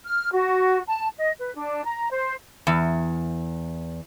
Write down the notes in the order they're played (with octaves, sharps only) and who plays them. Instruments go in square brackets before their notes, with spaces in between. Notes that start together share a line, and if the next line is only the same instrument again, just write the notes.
[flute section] F6
F#4
A5
D#5
B4
D4
A#5
C5
[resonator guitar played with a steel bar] E2